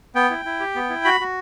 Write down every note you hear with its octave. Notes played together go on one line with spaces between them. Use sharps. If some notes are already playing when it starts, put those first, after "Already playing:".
B3 G5
E4
E4
G4
B3
E4
F#4 B5
F#4